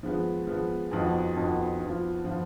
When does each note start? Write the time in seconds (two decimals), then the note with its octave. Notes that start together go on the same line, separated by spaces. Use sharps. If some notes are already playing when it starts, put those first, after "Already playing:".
0.03 F3 G#3 B3
0.47 F3 G#3 B3
0.92 F2 F3 B3 D#4 F#4
1.36 F2 F3 B3 D#4 F#4
1.80 F3 B3 F4
2.24 F3 B3 F4